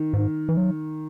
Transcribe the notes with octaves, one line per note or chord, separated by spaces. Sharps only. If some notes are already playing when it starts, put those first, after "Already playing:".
Already playing: D#3
G#2
E3
F#3